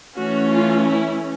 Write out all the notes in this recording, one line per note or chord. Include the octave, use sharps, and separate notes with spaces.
E3 A3 C#4 F#4
F4
E4